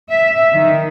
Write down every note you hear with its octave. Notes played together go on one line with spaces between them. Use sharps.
E5
D#3